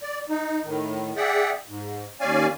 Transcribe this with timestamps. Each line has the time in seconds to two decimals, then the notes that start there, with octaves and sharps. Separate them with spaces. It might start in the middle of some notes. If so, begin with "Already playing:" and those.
0.02 D5
0.29 D#4
0.64 A2 D#3
1.16 G#4 D5 E5 F#5 G5
1.68 G#2
2.20 D#2 C#4 D5 F5 G#5